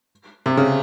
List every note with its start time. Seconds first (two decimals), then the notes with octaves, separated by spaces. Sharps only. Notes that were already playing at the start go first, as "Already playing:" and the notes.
0.46 C3
0.57 C#3